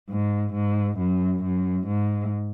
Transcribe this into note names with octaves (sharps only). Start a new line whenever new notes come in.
G#2
G#2
F#2
F#2
G#2